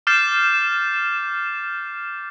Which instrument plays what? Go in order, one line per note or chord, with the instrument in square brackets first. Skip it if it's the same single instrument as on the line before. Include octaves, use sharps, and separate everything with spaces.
[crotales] D6 F6 G6 A6 C7 E7